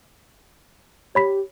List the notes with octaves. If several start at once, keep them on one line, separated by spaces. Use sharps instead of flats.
G4 C#5 B5 B6